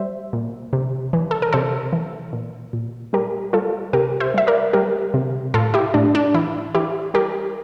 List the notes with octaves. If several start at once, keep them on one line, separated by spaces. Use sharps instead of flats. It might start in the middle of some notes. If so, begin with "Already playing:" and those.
Already playing: G3 C5 E5
A#2
C3
E3
A4
A#4
C3 A4 C5
E3
A#2
A#2
G3 G4 A#4
G3 F4 A4
C3 G4 A#4
C5 E5
G3 E5
A#4 D5
G3 G4 A#4
C3
A2 F4 A4
E4 G4
A2 D4
D4
E3 E4
E3 E4 G4
G3 G4 A#4